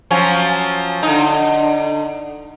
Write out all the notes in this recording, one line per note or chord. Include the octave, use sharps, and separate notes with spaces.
F3 F#3 C#4
D3 D#4